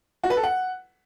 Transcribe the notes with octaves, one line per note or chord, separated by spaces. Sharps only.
F#4
B4
A4
F#5